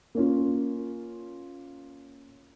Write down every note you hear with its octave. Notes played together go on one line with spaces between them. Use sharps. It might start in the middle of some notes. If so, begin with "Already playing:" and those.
A#3 C#4 F4